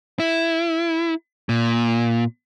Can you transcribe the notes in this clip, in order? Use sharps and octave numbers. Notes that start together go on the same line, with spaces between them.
E4
A#2